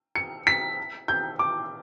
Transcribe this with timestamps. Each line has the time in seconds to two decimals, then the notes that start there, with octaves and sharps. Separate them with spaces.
0.15 C#7
0.47 B6
1.08 G6
1.39 D6